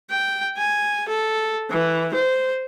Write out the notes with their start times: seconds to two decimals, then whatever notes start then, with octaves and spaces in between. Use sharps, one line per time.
0.11 G5
0.58 G#5
1.09 A4
1.71 E3
2.14 C5